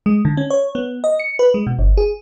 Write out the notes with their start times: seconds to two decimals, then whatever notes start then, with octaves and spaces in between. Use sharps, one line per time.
0.06 G#3
0.25 D3
0.37 C#4
0.50 C#5
0.75 B3
1.04 D#5
1.20 C#7
1.39 B4
1.54 G#3
1.67 B2
1.79 G1
1.97 G#4